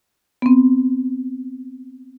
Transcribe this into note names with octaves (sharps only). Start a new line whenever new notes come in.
B3 C4